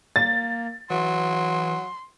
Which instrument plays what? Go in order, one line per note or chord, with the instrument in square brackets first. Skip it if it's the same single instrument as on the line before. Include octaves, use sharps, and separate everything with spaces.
[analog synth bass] A#3 [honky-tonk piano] A6
[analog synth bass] E3 [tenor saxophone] F#3 [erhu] C6